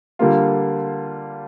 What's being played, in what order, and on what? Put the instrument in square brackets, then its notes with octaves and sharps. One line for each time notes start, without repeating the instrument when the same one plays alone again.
[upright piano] D3 G3 A#3 F4